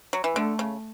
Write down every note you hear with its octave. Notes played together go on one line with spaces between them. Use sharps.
F#3
E3
D3 A3
C#3